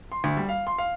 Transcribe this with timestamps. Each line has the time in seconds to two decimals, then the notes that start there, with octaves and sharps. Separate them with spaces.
0.12 C6
0.24 D2
0.37 G3
0.49 F5
0.67 C6
0.78 F5